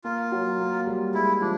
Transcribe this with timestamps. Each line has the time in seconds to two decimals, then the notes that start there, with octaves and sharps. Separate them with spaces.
0.04 A#3 F4
0.32 F#3
0.59 A#3
0.87 G3
1.14 G#3 E4
1.42 F3 D4